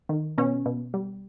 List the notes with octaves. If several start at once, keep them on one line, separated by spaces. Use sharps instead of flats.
D#3
B2 C#4
B2
G3